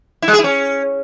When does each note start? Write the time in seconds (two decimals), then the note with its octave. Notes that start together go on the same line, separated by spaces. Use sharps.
0.22 E4
0.28 G#3
0.33 G#4
0.39 E4
0.44 C#4